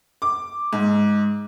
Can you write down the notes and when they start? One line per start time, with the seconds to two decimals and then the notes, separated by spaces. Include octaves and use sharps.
0.22 D6
0.73 G#2